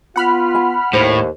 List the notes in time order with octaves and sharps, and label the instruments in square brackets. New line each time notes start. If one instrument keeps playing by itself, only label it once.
[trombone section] B3 F4 [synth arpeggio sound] F#5 B5 F6
[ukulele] G#5
[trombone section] D#2 [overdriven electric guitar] A2 [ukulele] C5